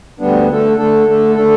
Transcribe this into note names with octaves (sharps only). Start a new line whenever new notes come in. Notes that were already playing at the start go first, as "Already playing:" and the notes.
D2 D3 G3 B3 D4
D3 A3 D4 A4
D3 A3 D4 A4
D3 A3 D4 A4
D3 A3 D4 A4